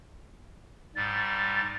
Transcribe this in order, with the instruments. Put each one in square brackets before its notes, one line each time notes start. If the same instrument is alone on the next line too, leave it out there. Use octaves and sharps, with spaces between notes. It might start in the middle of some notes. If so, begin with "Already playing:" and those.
[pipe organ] G#2 G3 [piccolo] A6